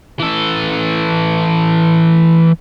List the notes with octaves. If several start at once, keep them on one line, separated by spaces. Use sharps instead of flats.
E3 A4